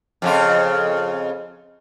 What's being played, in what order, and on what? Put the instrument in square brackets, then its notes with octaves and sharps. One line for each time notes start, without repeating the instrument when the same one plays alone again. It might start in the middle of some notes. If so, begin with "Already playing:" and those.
[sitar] F2 C#3 F4